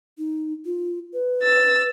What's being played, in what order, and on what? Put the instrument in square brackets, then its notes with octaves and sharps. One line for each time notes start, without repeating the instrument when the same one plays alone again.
[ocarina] D#4
F4
B4
[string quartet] E6 A6